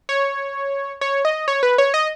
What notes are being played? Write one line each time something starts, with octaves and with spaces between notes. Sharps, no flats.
C#5
C#5
D#5
C#5
B4
C#5
D#5